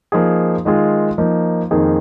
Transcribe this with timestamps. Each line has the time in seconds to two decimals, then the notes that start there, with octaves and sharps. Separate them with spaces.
0.12 F3 A#3 D#4 G#4
0.65 D#3 G#3 F4 G#4
1.18 F3 A#3 D#4
1.71 F2 D#3 A#3 D#4 G#4